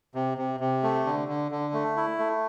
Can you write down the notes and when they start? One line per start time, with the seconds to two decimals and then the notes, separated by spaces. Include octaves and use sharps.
0.15 C3
0.38 C3
0.60 C3
0.83 A3
1.06 D3
1.28 D3
1.52 D3
1.74 A3
1.96 E4
2.19 A3